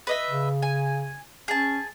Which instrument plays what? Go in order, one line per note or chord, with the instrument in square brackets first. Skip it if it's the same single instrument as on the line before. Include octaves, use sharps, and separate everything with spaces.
[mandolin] B4 D#5 E5
[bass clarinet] C#3
[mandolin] G#5
[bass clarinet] C#4 [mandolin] G#4 A5